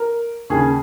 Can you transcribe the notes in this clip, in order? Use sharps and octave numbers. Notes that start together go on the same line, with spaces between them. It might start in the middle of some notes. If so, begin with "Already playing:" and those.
Already playing: A#4
D#2 C#3 G#4